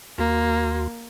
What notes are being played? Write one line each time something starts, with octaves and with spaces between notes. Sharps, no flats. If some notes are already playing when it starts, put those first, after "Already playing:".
D#2 A#3 F#4 C6